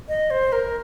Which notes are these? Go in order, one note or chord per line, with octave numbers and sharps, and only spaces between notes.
D#5
C5
A#4